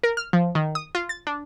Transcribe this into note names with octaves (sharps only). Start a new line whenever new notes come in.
A#4
F6
F3
D#3
D#6
F4
A6
D4